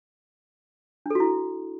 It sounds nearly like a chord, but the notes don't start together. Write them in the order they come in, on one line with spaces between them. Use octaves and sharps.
D4 A4 F#4 E4